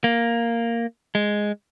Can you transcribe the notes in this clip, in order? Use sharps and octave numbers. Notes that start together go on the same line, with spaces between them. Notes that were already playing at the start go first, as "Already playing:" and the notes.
A#3
G#3